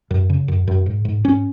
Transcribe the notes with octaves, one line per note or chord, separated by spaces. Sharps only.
F#2
C#3
F#2
F#2
G#2
G#2
G#2 C#4